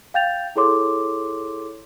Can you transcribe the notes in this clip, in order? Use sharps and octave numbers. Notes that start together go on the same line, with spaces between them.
F5 G5 G6 A6 F7
E4 G#4 A4 C#5 C6 D6